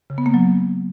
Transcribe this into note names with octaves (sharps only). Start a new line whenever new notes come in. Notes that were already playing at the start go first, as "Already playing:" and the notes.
C#3
B3
A#3
F#3